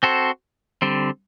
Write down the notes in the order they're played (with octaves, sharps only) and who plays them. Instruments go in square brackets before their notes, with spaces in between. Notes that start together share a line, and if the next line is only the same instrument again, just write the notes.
[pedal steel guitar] C4 F#4 A4 C5
D3 G3 C4